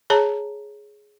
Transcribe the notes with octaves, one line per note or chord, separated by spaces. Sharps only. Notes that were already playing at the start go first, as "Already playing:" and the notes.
G#4 C#5 A5 A#5